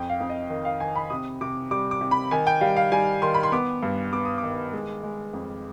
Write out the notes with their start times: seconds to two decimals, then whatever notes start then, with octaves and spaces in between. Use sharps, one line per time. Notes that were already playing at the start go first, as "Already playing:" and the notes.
Already playing: F2 G5
0.09 F5
0.20 F2
0.30 D#5
0.50 D#3
0.65 F5
0.80 D#3 G#5
0.96 B5
1.10 C3 D#6
1.41 C3 D6
1.71 G3 D6
1.91 D6
2.01 C3
2.11 B5
2.31 D#3 G#5
2.47 G5
2.61 G3 F5
2.76 F5
2.92 G3 G#5
3.22 D#3 C6
3.34 B5
3.43 C6
3.52 B3 D6
3.83 G2
4.13 B3 D6
4.25 D#6
4.38 D#3 D6
4.73 G#3
5.03 G#3
5.33 F2